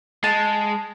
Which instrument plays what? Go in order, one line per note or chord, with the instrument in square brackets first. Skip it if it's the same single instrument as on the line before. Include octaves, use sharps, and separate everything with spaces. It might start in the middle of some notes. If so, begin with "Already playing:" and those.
[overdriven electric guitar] G#3 [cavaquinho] A5